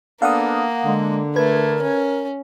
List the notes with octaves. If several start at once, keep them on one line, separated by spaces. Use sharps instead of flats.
A#3 B3 D4 A4 F5 F#5 D#6
D3 G#3
A3 A#4 B4 G#6
C#4